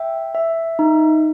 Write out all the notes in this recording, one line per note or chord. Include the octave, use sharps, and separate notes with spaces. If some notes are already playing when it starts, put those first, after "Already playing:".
Already playing: E5 G5
E5
D#4